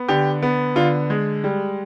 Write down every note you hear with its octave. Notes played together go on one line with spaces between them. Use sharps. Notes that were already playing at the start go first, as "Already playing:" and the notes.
Already playing: B3
D3 G4
B3
D3 F4
G#3
G3